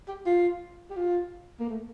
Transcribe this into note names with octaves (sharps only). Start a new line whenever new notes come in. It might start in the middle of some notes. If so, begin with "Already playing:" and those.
G4
F4
G4
F4
A#3
A3